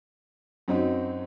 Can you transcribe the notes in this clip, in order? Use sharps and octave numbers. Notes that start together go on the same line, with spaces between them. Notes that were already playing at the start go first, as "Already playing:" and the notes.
F#2 F#3 C4 D#4